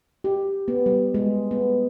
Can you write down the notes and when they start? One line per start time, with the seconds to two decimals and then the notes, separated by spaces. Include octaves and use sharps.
0.24 G4
0.68 B3
0.86 G3
1.14 G#3
1.51 B3